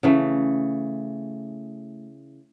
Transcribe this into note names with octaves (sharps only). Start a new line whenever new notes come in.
C#3 E3 A3